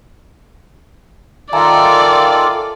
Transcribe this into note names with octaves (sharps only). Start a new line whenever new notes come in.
D#3 F4 A4 D5 E5 G#5 A#5